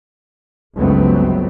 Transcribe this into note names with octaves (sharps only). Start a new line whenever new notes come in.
G1 C#2 F#3 A3 B3 C4